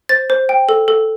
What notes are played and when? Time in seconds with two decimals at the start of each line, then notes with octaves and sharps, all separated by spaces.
0.09 C5 A6
0.30 C5
0.49 G5
0.69 A4
0.88 A4